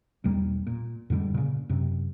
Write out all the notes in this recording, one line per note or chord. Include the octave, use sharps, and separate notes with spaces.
B1 E2 G3 A#3
A#2
F2 G#2 D3 G3
A#2 C#3
F#2 C3